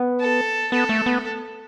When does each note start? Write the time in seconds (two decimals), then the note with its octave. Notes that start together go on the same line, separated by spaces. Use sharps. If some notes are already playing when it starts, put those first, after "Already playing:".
Already playing: B3
0.20 A4
0.72 B3 A4
0.89 A3
1.06 B3